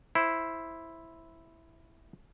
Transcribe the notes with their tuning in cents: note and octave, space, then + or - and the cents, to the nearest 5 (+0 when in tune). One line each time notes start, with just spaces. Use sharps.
E4 +0 C5 +5